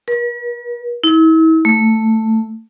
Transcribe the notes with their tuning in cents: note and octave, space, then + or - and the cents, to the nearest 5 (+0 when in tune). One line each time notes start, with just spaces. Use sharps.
B4 -45
E4 -40
A3 +10